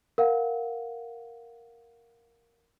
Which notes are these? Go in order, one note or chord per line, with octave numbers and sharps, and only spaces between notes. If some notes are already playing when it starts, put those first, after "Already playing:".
A#4 F5 F#5